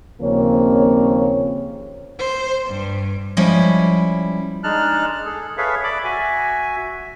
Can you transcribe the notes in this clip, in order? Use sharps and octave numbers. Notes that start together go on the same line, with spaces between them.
D#2 C#3 F3 A#3 C4 C#5
C5
G2
F3 G3 G#3 C#4 E4
G#3 D4 D#4 A5 F6 F#6
G#4 A4
G#4 A4 B4 C#5 E5 F5
D5 E5 B5 D6
F#4 E5 G#5